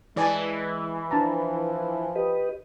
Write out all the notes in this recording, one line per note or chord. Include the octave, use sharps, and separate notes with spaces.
E3 G#3 E4 D5 G#5
F3 D4 A5 A#5
G4 B4 D#5